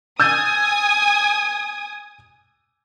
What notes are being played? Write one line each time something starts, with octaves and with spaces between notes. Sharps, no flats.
G#5 D#6 E6 G6 A6